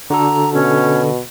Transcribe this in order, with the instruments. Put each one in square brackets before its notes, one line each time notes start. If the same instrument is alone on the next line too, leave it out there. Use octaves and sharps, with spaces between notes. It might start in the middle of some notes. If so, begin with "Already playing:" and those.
[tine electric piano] D3 F#4 A4 [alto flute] A#5
[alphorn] B2 [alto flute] C#4